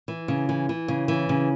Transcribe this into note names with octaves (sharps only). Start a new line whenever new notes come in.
E3
C#3
E3
E3
C#3
E3
C#3